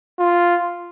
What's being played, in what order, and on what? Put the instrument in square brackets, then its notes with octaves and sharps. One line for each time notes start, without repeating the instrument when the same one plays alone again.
[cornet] F4